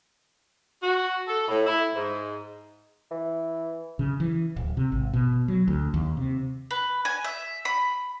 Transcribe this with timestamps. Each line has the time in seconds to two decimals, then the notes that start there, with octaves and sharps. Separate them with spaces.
0.81 F#4
1.27 A4
1.48 A2
1.65 E4
1.95 G#2
3.11 E3
3.99 C#3
4.20 E3
4.56 D1
4.77 C3
4.92 G#1
5.13 B2
5.48 F#3
5.68 D2
5.94 D#2
6.17 C3
6.71 B4
7.05 G#5
7.24 E5
7.65 B5